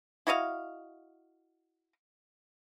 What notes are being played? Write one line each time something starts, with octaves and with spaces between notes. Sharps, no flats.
E4 F#4 D#5 F5